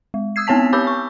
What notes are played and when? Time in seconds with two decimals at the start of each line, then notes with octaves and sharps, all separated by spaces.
0.14 G#3
0.36 D#6 E6 G#6 C7
0.47 B3 C4 C#5 G#5 A5 B6
0.73 G4 C#5 B5 D6 E6 G6
0.87 C#6